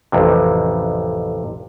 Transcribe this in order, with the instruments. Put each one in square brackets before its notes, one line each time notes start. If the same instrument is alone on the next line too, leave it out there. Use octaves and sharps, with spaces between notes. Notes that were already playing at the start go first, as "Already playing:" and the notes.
[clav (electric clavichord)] A1 F2 C3